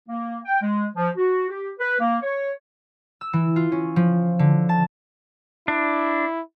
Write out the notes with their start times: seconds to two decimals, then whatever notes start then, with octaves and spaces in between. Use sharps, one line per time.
0.08 A#3
0.45 G5
0.62 G#3
0.95 F3
1.17 F#4
1.49 G4
1.79 B4
2.00 A#3
2.22 C#5
3.21 E6
3.33 E3
3.56 F4
3.72 C#4
3.96 F3
4.39 D3
4.69 A5
5.68 D4 E4